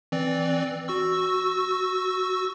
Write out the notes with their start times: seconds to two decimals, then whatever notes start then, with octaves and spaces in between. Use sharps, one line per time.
0.12 E3 C4 D5
0.88 F#4 C#6 E6